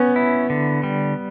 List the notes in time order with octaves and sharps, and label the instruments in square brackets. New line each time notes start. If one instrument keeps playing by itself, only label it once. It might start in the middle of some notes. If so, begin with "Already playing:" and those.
Already playing: [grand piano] B3 [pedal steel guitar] C#4
[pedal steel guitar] E4
D3
G3